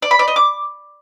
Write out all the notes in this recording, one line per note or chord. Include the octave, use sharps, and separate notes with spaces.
D5
B5
D5
D#5
D6